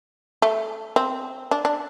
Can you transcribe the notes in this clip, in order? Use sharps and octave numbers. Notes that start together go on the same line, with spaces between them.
A3
C4
D4
D4